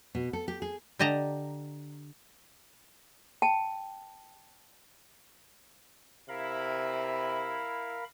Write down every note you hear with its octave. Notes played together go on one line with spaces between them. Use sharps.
B2
A4
G4
G#4
D3 G4 D#5 A5 A#5
G5 A5
C3 E4 A#4 F5 B5